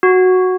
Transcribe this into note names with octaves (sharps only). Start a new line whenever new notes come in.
F#4